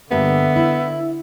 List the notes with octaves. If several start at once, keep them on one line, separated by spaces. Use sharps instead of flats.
G2 D3 A#3 B3 E5
E4